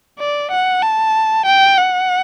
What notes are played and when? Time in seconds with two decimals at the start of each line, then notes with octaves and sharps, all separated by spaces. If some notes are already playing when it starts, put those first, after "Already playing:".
0.19 D5
0.51 F#5
0.82 A5
1.46 G5
1.78 F#5